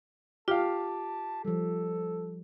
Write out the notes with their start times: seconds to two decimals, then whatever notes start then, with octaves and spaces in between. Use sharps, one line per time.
0.48 F4 G4 F5 A5
1.45 F3 G3 A4